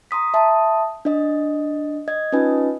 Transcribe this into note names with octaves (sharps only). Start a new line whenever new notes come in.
A#5 C6 D#6 B6
E5 A5 C6 D#6
D4 D#5
D#5 G#6
C#4 D#4 F4 B4 D#5 G#5